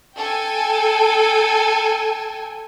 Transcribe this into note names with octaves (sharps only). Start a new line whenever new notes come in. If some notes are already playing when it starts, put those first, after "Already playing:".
A4 G5 G#5